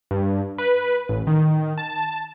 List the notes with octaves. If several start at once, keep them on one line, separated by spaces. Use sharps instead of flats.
G2
B4
A1
D#3
A5